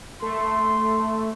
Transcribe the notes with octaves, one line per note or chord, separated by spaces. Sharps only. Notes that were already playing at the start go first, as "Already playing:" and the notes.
A3 C6